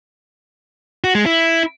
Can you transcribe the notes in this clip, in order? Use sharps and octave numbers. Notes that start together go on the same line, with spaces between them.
F#4
G#3
E4